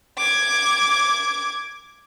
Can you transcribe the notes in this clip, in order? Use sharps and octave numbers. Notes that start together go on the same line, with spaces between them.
D6 G#6